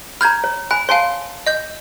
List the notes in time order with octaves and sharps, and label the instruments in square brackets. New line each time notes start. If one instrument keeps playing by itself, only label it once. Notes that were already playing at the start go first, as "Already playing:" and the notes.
[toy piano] A#5 B5 [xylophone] F6 G6 G#6
[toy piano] C#5
[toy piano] G#5 B5 [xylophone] F#6
[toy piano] C#5 G#5 A5 [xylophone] F5 C6
[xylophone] D#5 G6